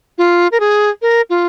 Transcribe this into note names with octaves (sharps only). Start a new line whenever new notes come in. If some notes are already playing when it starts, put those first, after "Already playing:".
F4
A#4
G#4
A#4
F4